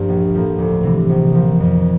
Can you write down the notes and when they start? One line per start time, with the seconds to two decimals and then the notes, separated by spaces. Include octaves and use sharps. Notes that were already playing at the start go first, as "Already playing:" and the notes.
Already playing: G2 F3 A#3
0.08 A#1
0.34 A2 F3 A#3
0.58 D2
0.83 C3 E3
1.09 A#1
1.34 A#2 F3 A#3
1.60 F2